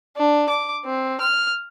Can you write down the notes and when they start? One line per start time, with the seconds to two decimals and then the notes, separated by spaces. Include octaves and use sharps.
0.17 D4
0.49 D6
0.85 C4
1.21 F6